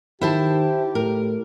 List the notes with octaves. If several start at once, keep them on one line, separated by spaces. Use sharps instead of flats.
D#3 E4 G4 C5 A5
A2 A#4